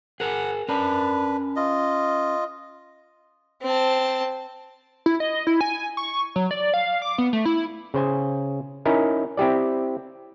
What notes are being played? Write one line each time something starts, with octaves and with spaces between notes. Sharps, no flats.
G#4 A#4 F#5 G#5
C#4 D4 A#4 B4
F4 D#5
C4 A5
E4
D#5
E4
G#5
C#6
F#3
D5
F5
D6
B3
A3
E4
C#3 C5 G#5
C#4 D#4 E4 A#4
C4 E4 G4 D5